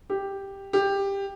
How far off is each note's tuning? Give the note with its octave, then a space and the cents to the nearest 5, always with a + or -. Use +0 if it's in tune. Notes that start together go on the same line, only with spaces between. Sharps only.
G4 +5
G4 +15